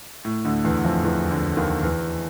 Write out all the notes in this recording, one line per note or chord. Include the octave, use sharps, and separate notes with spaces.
A2
D2 D3
E2 E3
F2 F3
E2 E3
D2 D3
D#2 D#3
E2 E3